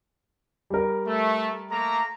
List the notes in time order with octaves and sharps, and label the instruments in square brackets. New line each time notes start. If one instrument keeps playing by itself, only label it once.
[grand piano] G3 A#4
[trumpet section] A3
A3 A#3 A#5